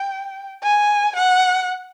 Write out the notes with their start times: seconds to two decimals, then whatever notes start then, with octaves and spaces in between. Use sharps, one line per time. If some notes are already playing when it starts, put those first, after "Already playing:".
Already playing: G5
0.63 G#5
1.16 F#5